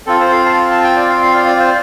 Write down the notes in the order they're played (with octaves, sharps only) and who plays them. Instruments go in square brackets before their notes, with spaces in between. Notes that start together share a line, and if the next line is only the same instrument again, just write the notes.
[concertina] C4 F4 A4
C5
F5
A5
C6
A5
G5
D5
F5
F5
D5
D5
C5